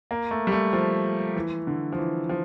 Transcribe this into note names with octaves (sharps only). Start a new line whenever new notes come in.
A#3
A3
G3
A3
F3
E3
D3
F3
E3
F3